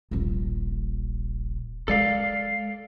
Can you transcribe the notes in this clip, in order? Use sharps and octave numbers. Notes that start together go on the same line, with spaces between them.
D#1 A#1
G#3 A4 D5 F5